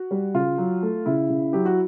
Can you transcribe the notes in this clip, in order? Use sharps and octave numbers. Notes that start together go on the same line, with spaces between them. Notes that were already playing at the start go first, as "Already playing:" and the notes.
Already playing: F#4
G3
C#3 F4
F#3
A3
C#3 E4
C#3
F#3 G4
F#4